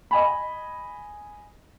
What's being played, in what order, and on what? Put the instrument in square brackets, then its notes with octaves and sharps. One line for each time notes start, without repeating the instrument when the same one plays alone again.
[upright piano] D#5 G#5 B5